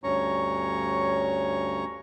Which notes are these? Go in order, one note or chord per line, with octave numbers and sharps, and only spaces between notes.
D2 G2 C#4 C#5 A#5 C#6